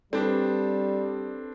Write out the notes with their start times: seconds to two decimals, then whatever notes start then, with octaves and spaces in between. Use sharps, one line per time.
0.13 G3 C4 D4 G4 A4 B4